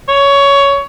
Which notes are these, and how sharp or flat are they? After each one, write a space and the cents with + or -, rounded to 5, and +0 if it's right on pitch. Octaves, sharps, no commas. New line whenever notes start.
C#5 +15